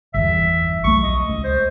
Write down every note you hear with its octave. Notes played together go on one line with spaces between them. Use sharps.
G1 E2 E5
B1 A3 C#6
D#5
C#2
C5